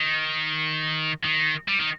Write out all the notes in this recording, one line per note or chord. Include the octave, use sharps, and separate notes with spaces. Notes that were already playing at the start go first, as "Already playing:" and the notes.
Already playing: D#3
D#3
G3
D#3